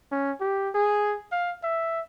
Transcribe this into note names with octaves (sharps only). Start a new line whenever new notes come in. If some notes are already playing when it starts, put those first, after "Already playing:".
C#4
G4
G#4
F5
E5